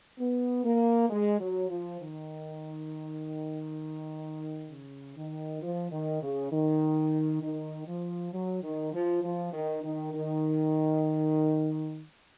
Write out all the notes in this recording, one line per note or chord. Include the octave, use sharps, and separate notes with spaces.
B3
A#3
G#3
F#3
F3
D#3
C#3
D#3
F3
D#3
C#3
D#3
D#3
F3
F#3
D#3
F3
F3
D#3
D#3
D#3